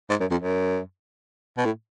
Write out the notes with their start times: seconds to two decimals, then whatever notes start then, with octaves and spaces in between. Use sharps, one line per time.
0.10 G#2
0.20 F#2
0.31 F2
0.41 F#2
1.57 B2
1.65 A2